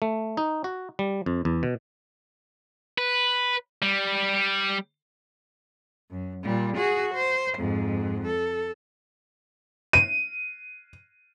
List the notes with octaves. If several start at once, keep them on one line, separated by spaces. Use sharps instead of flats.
A3
D#4
F#4
G3
F2
E2
B2
B4
G3
F#2
A#2 G3
F#4 G#4
C5
F2 G#2
A4
D#7